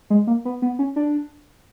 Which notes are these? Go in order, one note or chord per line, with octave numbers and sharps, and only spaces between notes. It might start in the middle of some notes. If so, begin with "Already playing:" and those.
G#3
A#3
B3
B3
C#4
D4